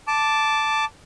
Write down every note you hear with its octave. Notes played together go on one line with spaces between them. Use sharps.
A5 D6